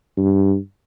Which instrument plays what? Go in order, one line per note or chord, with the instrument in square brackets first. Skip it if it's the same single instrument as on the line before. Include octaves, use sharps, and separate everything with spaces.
[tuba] G2